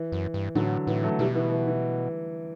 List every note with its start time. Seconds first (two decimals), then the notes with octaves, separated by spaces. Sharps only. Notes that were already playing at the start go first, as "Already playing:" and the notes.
Already playing: E3
0.12 F#2
0.34 G2
0.55 A2 D3 F#3
0.87 A2 E3
1.03 F#3 A3
1.19 B2 E3 G3
1.35 E3
1.51 E3
1.67 E3